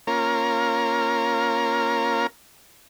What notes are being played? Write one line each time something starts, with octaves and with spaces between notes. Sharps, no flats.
A#3 C#4 F4 A#4